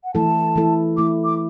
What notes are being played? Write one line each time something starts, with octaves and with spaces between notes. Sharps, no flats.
F#5
E3 A3 E4 A4 A5
E3 A3 E4 A4
E3 A3 E4 A4 D6
D6